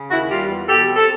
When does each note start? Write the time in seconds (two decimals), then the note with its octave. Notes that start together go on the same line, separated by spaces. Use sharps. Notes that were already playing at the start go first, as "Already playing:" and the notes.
Already playing: C#3
0.11 D#2 E4 F#4
0.30 G3 F4 G4
0.49 E2
0.68 B2 G4 A4
0.87 C4
0.96 A4